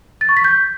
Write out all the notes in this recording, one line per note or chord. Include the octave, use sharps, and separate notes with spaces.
A6
C#6
B6
G6